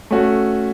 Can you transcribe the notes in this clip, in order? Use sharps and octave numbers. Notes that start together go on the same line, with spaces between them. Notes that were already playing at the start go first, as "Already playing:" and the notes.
A3 C#4 F#4 A4